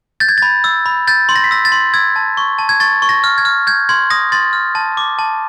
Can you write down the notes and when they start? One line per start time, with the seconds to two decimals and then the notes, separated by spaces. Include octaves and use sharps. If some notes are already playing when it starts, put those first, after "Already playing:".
0.20 G6 A6
0.29 G#6
0.38 B5 A6
0.64 E6
0.86 B5
1.08 G6 A6
1.29 C6
1.36 A#6
1.44 B6
1.51 E6 A#6
1.65 A6
1.72 C6
1.94 E6 G#6
2.16 A5
2.37 C#6
2.59 A5
2.69 G#6
2.80 C#6 A6
3.02 C#6
3.09 A#6
3.24 F6
3.38 G#6
3.45 F6
3.67 G6 G#6
3.89 C6 G#6
4.10 D#6 A#6
4.32 C6 A6
4.53 F6
4.75 A5
4.97 D6
5.19 A5